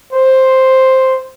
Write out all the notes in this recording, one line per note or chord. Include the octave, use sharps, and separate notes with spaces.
C5